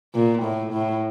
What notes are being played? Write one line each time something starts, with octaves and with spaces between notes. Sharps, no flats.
A#2
A2
A2